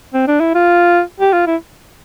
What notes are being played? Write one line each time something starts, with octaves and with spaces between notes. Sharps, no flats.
C4
D4
E4
F4
G4
F4
E4